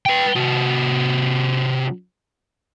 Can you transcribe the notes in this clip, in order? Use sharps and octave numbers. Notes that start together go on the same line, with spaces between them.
B4 G5
C3 F#4